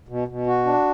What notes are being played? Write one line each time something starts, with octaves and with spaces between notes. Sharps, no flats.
B2
B2
F#4
D4